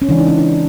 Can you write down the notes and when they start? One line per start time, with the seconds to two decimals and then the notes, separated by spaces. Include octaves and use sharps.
0.02 C#4
0.08 C#3 E3 G#3 D4
0.18 D#4
0.28 C#4
0.39 D4